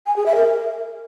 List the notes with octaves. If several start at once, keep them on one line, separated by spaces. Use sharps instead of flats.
G#5
G#4
E5
A#4